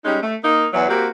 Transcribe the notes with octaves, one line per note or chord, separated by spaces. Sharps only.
G3 G#3 C#4 D#4
A3
A#3 D#4
E2 F#3
A#3 C4 F#4 G4